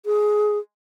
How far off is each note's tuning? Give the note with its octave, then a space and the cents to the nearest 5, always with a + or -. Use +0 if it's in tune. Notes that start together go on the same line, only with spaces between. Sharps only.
G#4 +15